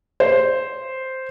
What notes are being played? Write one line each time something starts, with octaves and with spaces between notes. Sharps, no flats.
C5